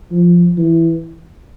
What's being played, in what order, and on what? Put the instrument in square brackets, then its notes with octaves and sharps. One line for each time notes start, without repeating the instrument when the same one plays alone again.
[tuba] F3
E3